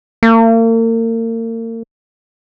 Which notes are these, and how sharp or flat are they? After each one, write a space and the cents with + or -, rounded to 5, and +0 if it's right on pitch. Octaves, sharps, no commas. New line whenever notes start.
A#3 -40